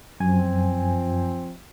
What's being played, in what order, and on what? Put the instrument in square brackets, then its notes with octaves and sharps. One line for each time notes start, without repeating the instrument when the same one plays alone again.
[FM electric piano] F#2 G#5 [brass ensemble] F3 C4